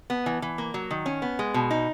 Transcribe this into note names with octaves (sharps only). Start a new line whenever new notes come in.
B3
E3
E3
A#3
F#3
D#3
C#4
B3
G#3
B2
D#4